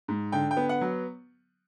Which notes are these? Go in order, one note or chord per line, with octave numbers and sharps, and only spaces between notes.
G#2
D3 G5
G5
B3
F#5
F#3